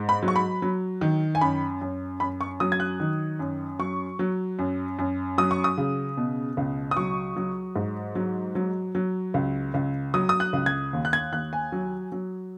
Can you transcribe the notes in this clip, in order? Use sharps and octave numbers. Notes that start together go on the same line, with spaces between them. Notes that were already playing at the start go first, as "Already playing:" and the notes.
Already playing: G#2
B5
F#3
C#6
B5
F#3
D#3
G#5
F#2 B5
F#2
F#2 B5
C#6
F#3 D#6
G#6
F#6
D#3
F#2
F#3 C#6
F#3
F#2
F#2
F#3 D#6
C#6
D#6
C#3
B2
C#2
D#6
F#3 C#6
F#3
G#2
F#3
F#3
F#3
C#2
C#2
F#3 D#6
D#6
F#6
C#2
G#6
D#2
F#6
G#6
D#2 F#6
G#5
F#3
F#3